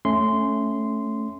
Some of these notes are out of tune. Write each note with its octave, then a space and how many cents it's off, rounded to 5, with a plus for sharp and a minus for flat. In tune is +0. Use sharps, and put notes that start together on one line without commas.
A3 +0 C#4 +0 C6 -10